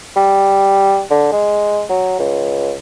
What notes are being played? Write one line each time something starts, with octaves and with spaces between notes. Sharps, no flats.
G3
D3
G#3
F#3
C#2